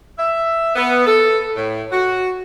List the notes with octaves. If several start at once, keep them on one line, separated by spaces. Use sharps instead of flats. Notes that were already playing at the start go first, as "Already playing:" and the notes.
E5
B3
A4
A2
F#4